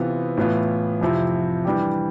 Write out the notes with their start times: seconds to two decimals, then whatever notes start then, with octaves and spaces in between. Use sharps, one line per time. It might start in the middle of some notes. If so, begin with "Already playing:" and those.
Already playing: C3 E3 B3 F4
0.37 A2 E3 B3 F4
1.01 F2 C3 F3 C4 E4
1.65 E3 G3 D4 G4